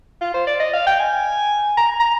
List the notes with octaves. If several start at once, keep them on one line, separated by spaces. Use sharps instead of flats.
F4
C5
D5
D#5
F5
G5
G#5
A#5
A#5